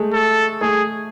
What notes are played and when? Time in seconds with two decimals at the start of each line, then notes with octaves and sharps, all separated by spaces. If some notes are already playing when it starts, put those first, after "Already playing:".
Already playing: G#3 A3
0.14 A4
0.61 A3 G#4